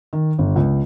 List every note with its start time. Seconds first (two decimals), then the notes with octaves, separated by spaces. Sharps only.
0.13 D#3
0.38 G1
0.56 C#2